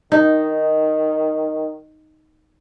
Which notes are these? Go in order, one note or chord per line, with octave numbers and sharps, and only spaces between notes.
D#3 D#4